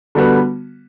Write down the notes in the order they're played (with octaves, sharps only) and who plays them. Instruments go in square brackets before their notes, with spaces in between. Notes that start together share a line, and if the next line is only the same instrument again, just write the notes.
[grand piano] D3 G3 B3 F#4 B4